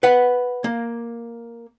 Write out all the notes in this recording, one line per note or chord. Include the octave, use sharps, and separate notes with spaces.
B4 F#5
A#3